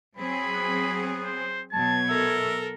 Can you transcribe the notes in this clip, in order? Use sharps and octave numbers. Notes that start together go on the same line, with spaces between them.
F#3 C4 G#4 B5
B3
C5
B2 F#3 A5 G#6
A4 A#4 E5